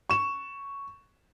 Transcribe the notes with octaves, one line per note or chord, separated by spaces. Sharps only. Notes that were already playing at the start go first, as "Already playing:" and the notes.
C#6 E7